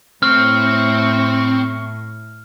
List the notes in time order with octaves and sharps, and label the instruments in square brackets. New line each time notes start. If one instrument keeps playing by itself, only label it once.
[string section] A2 [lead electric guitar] C4 [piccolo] C#6 [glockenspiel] F6